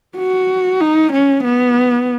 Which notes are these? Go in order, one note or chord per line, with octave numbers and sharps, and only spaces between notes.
F#4
D#4
C#4
B3